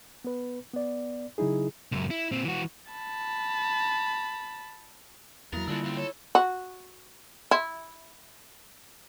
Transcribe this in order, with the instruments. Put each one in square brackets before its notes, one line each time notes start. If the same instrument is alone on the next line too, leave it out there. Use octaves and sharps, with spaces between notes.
[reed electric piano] B3 B4
B3 D5
C#3 F#3 D#4 E4 G#4
[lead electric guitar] C#2 F#2
E4
A#2 C4
E3 F#4
[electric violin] A5 B5
[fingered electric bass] E2 F#3 [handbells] A#3 E4 A6 [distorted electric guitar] A#4
[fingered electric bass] D3 G3 A#3 [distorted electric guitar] G#3 D4 [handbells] E4 F4 E6
[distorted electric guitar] F#2 C4
[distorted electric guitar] A4 [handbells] C#5
[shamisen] F#4
E4